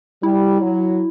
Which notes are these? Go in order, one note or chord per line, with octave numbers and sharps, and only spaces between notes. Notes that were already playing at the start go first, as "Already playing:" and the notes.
G3 E4
F#3